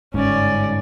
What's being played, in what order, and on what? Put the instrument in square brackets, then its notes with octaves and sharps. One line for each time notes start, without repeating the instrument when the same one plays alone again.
[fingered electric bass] G1 G#2 [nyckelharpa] C#4 D5